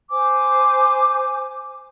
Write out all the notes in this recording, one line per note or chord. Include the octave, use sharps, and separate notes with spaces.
C5 G#5 D6